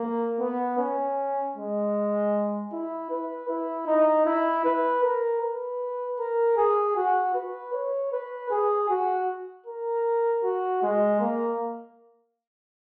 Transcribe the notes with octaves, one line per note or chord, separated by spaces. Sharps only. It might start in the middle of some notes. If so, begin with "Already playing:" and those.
Already playing: A#3
B3
C#4
G#3
E4
B4
E4
D#4
E4
B4
A#4
B4
A#4
G#4
F#4
B4
C#5
B4
G#4
F#4
A#4
F#4
G#3
A#3